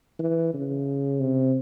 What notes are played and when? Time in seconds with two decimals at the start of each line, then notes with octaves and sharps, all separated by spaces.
0.19 E3
0.54 C#3
1.20 C3